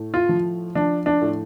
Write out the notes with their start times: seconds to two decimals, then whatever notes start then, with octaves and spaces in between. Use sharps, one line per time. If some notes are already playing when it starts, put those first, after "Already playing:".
Already playing: A2
0.14 F4
0.29 F3
0.75 F3 D4
1.06 D4
1.21 A2